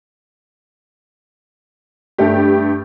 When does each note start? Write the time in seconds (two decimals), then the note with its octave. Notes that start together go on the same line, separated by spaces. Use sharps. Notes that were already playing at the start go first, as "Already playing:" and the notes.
2.18 G2 A3 G4